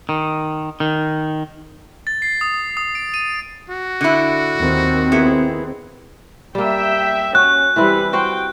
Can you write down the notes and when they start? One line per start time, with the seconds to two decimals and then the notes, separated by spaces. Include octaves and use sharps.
0.09 D#3
0.80 D#3
2.07 A6
2.22 C7
2.41 D#6
2.77 D#6
2.95 D7
3.14 D#7
3.70 F#4
4.01 D3 E4
4.59 D#2 D#3 C4
5.12 B3 E4 G#4
6.55 G3 A#3 E5 G5
7.35 C#4 F#4 F#6
7.76 E3 G3 C4 E4 B4
8.13 F#4 C5 F#5 G5